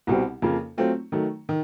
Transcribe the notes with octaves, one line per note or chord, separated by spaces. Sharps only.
C2 B2 G3 C4
F2 C#3 F3 A#3
F#3 A3 C4 F4
D#3 F#3 A3
D#3